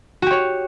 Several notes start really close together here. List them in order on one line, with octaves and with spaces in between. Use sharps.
F#4 G4 C#5